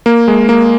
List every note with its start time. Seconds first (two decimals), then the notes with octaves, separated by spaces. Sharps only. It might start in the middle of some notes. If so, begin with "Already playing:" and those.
0.06 A#3
0.28 G#3
0.49 A#3